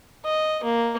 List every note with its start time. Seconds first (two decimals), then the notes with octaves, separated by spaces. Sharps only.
0.25 D#5
0.64 A#3